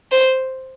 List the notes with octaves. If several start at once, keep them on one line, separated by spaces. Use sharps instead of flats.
C5